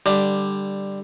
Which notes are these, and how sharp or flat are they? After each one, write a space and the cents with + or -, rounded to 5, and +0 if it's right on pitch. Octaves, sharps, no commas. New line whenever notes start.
D3 +10 G3 +5